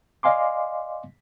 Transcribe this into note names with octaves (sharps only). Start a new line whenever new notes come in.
D5 D#5 F5 G#5 C6 D6